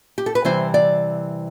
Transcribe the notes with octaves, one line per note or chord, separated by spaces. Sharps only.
G4
A4
B4
C3 E3 G3 C4 C5
D5